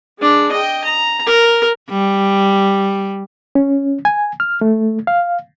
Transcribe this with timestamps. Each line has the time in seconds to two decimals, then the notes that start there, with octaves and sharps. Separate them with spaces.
0.19 G#3 D4
0.52 D#5 G5
0.84 A#5
1.26 A#4
1.90 G3
3.55 C#4
4.05 G#5
4.40 F6
4.61 A3
5.07 F5